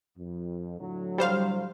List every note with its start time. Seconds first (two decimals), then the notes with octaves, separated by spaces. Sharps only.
0.16 F2
0.78 A2 D3 F#3
1.18 G3 C5 F5